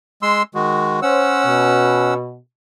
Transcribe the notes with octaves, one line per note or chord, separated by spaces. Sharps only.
G#3 C6 E6
D#3 G#3 F#4
C#4 C5 C#5 F#5 E6
B2